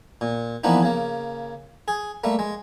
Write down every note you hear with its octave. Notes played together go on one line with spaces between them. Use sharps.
A#2
E3 F3 A#3 B3 D4 D#4
C#3 A#3
G#4
G3 A3 A#3
G#3